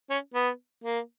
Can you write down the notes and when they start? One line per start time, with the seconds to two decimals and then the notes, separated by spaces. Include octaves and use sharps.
0.10 C#4
0.34 B3
0.84 A#3